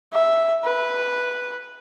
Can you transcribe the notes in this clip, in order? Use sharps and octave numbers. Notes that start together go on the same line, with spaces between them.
E5
B4